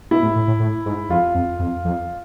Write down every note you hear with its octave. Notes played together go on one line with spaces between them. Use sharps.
B2 E4
A2
A2
A2
A2
G#2
F2 F4
F2
F2
F2